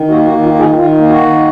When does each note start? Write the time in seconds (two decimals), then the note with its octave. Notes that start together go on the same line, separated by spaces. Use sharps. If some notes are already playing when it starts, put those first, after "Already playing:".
Already playing: D#3
0.09 A#3 F#4
0.26 F#4
0.31 D#3
0.43 F4
0.54 D#3
0.59 F4 G#4
0.76 D#3 F4
0.98 A#3
1.09 F#4
1.20 D#3